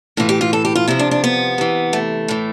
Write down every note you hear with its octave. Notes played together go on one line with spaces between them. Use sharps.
A2 E3 F4
G4
F4
A4
G4
F4
C3 F3 E4
D4
D4
B3
C3 E3
A3
A2 E3